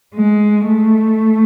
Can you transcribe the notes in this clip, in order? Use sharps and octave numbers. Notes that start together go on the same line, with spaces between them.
G#3
A3